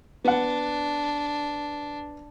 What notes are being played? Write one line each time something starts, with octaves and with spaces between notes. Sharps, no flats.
B3 D4 F#5